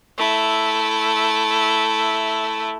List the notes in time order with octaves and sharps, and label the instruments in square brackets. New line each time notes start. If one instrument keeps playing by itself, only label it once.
[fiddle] A3 E4